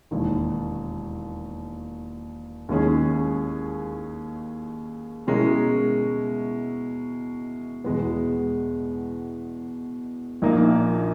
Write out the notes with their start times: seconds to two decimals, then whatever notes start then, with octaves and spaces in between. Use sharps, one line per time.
0.11 E1 D#2 D#3
2.69 D#2 D#3 G#3 C#4 G#4
5.27 B2 G#3 C#4 E4 A#4
7.84 E2 B2 G#3 B3
10.42 A#1 A#2 A#3 D#4